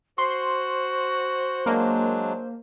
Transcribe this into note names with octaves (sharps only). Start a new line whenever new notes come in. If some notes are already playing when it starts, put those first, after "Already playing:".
F#4 C5 C6
F#3 G#3 A#3 D4